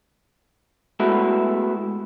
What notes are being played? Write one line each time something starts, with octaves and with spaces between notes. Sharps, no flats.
G#3 A3 B3 E4 F#4